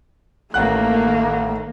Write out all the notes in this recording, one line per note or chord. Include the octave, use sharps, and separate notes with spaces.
A1 D#3 A3 A#3 F5 F#5 F#6